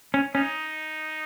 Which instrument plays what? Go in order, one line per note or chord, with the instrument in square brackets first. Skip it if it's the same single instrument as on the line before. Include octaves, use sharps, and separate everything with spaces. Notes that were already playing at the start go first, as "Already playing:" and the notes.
[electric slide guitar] C#4
[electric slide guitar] C#4 [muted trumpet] D#4